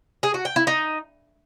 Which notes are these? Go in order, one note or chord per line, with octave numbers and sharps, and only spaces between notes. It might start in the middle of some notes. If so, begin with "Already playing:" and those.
G#4
F#4
G5
E4
D#4